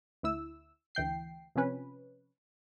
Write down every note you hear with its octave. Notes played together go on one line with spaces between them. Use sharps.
D2 E4 E6
D2 E3 G5 C7
C3 F3 C4 C#4 B4